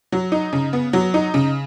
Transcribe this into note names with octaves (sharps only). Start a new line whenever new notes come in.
F#3
D#4
C#3
B3
F#3
D#4
C#3